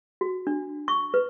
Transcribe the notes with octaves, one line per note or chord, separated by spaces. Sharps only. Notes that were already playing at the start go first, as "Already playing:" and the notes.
F#4
D4
C#6
B4